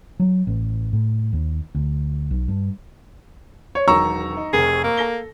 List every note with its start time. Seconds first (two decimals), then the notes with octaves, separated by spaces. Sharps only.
0.20 F#3
0.47 A1
0.93 A2
1.33 D#2
1.75 D2
2.31 B1
2.48 G2
3.75 C#5
3.88 E1 D#3 F#3 A#5 C#6 E6
4.37 D#4
4.53 F1 C3 G#4 A#4
4.83 A#3
4.97 A4 A#6 G7